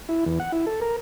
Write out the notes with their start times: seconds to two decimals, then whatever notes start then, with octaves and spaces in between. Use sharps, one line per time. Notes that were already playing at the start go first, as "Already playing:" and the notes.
0.09 E4
0.26 E2
0.40 F#5
0.52 E4
0.67 A4
0.81 A#4